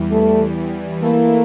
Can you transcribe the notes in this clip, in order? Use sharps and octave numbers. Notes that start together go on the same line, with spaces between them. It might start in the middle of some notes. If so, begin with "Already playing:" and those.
Already playing: E2 E3 G3
A3
E3 A3 A#3 E4 A4